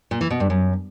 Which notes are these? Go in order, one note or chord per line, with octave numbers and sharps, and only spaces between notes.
A#2
E3
B2
G2
F#2